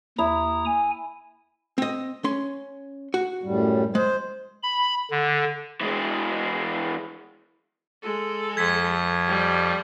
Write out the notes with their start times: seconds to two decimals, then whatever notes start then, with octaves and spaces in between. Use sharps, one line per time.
0.18 D#2 E4 A#5 D#6
0.66 G#5
1.78 C4 D#5
2.24 C#4 C6
3.14 F#4
3.43 F#2 A2 G3
3.95 G#3 C5
4.63 B5
5.11 D3
5.81 E3 G#3
8.03 G#3 A4
8.57 F2 G#6 B6
9.27 G3